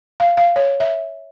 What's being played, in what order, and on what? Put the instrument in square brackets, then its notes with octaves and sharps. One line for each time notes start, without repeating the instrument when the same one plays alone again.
[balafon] F5
F5
C#5
E5